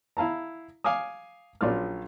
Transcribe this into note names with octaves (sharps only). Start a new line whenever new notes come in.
E4 F5 A5 A#5
F5 G#5 D6 D#6
A#1 F#3 C#4 F4 D5 F6